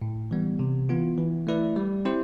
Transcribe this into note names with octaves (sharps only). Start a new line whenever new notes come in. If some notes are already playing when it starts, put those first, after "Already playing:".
A2
E3 G3 B3
C3
E3 B3 F4
E3
A3 E4 B4 D5
G3
C4 E4 G4 C5